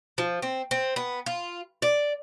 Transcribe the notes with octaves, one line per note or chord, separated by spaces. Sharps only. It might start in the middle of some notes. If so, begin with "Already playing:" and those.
F3
C4
C4
B3
F4
D5